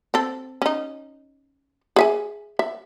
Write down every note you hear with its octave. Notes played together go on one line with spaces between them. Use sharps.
C4 A4
C#4 D#4
G#4 E5 G#5
E5